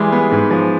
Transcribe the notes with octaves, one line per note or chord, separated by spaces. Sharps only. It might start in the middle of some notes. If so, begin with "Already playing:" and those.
Already playing: E3 G3 G#3 C6 D6
B3
G#2
F3